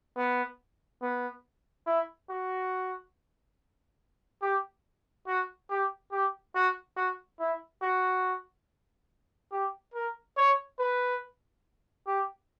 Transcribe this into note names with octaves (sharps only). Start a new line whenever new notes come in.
B3
B3
E4
F#4
G4
F#4
G4
G4
F#4
F#4
E4
F#4
G4
A#4
C#5
B4
G4